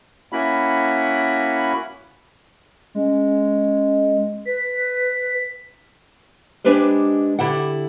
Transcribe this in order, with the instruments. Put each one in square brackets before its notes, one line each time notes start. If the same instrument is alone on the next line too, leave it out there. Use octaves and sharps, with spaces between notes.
[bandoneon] A#3 C#4 E4 F#4 B5
[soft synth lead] G#3 [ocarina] C#4
[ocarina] B4 [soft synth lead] B6
[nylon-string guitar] G#3 D4 G4 B4 C5
D3 E4 G4 F#5